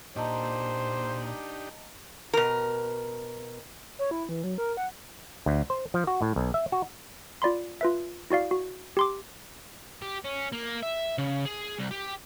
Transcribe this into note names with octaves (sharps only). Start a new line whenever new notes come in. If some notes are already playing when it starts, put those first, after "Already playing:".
A#2 D4 D#4 G4 C5 D#5 A5 A#5
B2 A#4
C#5
E4
E3
F#3
A#4
F#5
D2
C5
F3
F#4
A2
B1
E5
F#4
F4 D5 B5 C6
F4 B4 E5
E4 F#4 D5 F5
F#4
G4 C6 D6
G4
C#4
A#3
E5
C#3
G#4
C2
G4